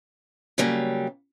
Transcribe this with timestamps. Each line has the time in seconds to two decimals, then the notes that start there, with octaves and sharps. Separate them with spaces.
0.58 C#3 F#3 G3 A#3